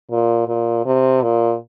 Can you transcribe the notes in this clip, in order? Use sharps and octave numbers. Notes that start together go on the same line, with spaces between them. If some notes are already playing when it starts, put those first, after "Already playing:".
A#2
A#2
C3
A#2